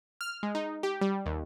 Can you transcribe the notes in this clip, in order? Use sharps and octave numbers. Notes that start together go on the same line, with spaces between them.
F6
G#3
D#4
G4
G3
D#2